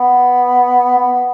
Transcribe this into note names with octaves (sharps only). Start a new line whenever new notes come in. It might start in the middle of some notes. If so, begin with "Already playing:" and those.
Already playing: B3
B3